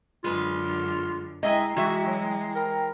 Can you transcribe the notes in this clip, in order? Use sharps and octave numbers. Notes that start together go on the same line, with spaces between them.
F#2 D3 G#3 F4 B4
G#3 E4 D#5 E5 G5 G#5 A#5
E3 G#3 F#4 E5
F#3
A#4 G5 A#5 B5